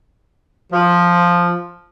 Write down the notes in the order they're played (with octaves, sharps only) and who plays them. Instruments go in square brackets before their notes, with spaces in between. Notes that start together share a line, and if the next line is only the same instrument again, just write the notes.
[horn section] F3